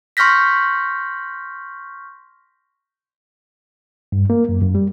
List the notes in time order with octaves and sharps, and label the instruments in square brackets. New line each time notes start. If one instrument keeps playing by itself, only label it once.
[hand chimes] C6 C#6 F6 G6 A#6 B6
[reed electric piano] G2
A#3
F#2
F#2
G3